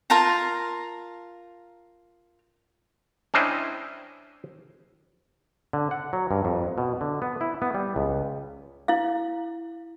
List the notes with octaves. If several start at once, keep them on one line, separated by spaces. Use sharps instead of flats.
F4 A#4 A5 A#5
C#4 D4 E4 C5 D#5 G5
D3
F#5
F#3
G2
F2
B2
D3
B3
E4
B3
G3
C#2
E4 F5